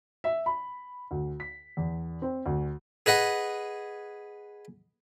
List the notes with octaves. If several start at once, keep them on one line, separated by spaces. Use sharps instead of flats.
E5
B5
D2
B6
E2
C4
D2
G#4 B4 D#5 F#5